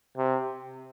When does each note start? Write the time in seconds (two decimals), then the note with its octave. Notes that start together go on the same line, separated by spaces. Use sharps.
0.17 C3